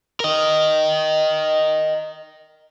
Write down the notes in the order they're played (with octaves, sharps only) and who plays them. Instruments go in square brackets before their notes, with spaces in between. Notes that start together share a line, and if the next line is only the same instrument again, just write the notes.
[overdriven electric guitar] A#4 D#5